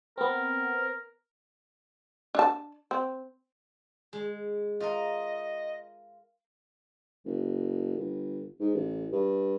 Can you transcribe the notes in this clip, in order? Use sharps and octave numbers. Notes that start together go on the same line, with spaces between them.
B3 C4 A#4
D4 A5
C4
G#3
F4 A#4 D#5
F#1
G1
G#2
A1
G2